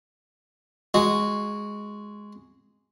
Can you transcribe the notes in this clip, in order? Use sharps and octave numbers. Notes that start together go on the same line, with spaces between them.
G#3 F#4